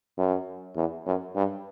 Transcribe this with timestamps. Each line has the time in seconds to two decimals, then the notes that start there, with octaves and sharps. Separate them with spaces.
0.18 F#2
0.76 E2
1.06 F#2
1.35 G2